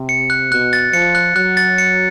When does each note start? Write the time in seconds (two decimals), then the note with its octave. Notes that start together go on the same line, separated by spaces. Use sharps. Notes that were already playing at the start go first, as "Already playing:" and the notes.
Already playing: C3
0.09 C#7
0.30 F#6
0.51 B2 F#6
0.73 A6
0.93 F3 C#7
1.15 F#6
1.36 F#3 F#6
1.57 A6
1.78 C#7